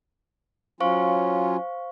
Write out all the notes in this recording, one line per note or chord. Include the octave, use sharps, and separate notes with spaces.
F#3 C#4 F4 C5 F5 C#6